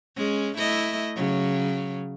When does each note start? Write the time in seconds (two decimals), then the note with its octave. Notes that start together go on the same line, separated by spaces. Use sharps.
0.17 G#3 C#4
0.57 A3 E4 D#5
1.16 C#3 F#3